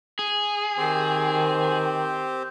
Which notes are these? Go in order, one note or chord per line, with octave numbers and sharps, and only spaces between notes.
G#4
D#3 C4 G4 C5